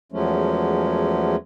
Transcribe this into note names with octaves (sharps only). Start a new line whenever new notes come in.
E2 F3 F#3 G#3 A3 C#4